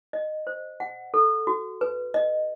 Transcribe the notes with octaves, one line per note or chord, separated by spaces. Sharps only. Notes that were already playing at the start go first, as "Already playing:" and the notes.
D#5
C5
F#5
A4
F#4
B4
D#5